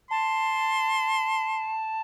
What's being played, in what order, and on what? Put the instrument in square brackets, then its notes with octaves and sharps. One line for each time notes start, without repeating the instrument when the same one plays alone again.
[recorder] A5 [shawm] C6